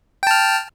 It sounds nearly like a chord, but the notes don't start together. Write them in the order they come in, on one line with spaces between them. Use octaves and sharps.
G5 A5 F6